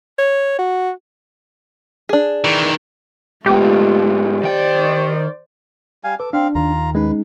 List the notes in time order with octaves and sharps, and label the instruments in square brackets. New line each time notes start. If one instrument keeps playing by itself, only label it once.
[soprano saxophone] C#5
F#4
[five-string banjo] D4 G#4
[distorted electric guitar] D#3 E3
[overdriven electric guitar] G#2 B3 [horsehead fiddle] A3 F4 [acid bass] G4
[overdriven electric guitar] D#3 G5 [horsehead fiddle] C5 D5
[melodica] G3 F5 G#5
[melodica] A4 D6 [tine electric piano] B4
[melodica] C4 F5 [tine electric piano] D4
[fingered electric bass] D#2 D#3 [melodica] F4 A#5
[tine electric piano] G#3 C#4 D#4 [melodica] B4